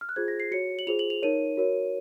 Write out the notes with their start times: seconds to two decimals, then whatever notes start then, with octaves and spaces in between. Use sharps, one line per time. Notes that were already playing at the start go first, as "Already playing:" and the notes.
0.01 F6
0.09 F#6
0.16 F4 G#4 C5 G#6
0.28 A#6
0.40 C7
0.51 F#4 C#5 C#7
0.79 F#7
0.87 F4 G#4 C5 F7
0.99 F#7
1.10 F7
1.22 D#4 A#4 C#5 D#7
1.57 F#4 A#4 C#5